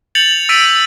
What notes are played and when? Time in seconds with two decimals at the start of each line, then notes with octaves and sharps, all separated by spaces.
0.15 G6 A6 C#7 F7 F#7
0.49 E6 A6 B6 D7 D#7